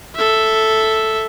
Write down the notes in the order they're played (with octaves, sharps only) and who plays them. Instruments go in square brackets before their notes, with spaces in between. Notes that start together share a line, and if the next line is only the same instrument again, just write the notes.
[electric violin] A4 E5